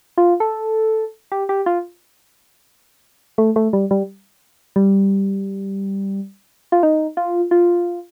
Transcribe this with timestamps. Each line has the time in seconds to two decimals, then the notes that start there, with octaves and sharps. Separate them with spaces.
0.18 F4
0.40 A4
1.32 G4
1.49 G4
1.66 F4
3.38 A3
3.56 A3
3.73 G3
3.91 G3
4.76 G3
6.72 F4
6.83 D#4
7.17 F4
7.51 F4